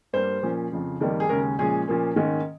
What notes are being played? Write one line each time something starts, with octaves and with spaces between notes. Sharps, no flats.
G2 G3 A#3 C5
A#2 F3 A#3 C#4
F2 C#3 F3
F2 D#3 G3 A#3
G#4
D#2 C#3 G#3 C#4 A#4
A#2 F3 G#3 C#4 G#4
A#2 F3 A#3 C#4
G#2 D#3 A#3 C#4